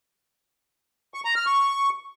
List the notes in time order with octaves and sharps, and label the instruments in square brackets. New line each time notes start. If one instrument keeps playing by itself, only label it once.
[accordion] C#6
A#5
F6
C#6